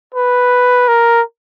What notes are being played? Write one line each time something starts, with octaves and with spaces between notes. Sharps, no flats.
B4
A#4